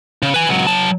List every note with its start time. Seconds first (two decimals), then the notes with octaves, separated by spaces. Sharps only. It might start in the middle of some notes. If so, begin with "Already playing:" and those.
0.22 C#3
0.34 B4 G#5
0.49 C#2 F#3
0.67 F#3 A5